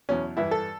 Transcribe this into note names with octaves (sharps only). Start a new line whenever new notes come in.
E2 B2 F#3 C#4
G2 E3 E4
A4